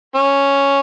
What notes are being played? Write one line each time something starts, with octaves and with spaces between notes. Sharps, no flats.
C#4